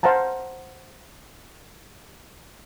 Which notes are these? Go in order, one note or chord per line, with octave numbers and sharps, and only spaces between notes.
C5 F5 F#5 A5 A#5